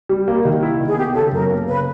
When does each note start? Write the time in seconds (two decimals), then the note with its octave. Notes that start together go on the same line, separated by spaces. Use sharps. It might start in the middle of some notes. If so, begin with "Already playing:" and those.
0.09 G3
0.28 A#3
0.45 D#3
0.63 E4
0.81 D#3
0.88 G#4
0.97 B3 G4
1.14 C#3 A4
1.32 F#2 A#4
1.50 A#3
1.68 C#3 B4